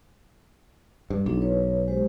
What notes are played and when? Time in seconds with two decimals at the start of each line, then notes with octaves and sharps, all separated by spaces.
1.10 G2
1.26 B1 D4 E4
1.41 B4 C#5
1.88 G#3 G4 C5